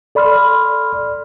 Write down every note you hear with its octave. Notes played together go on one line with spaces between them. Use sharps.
A4 D5 B5 C6 F6